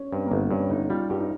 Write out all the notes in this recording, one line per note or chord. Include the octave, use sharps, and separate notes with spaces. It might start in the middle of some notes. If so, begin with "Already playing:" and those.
Already playing: C#4
G2 C4
A#3
G1 C4
G2 C#4
G1 D#4
G3 F4
G2 G4
D#4